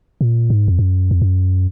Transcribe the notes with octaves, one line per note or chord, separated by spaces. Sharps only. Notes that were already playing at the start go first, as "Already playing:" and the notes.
A#2
G#2
F2
F#2
F2
F#2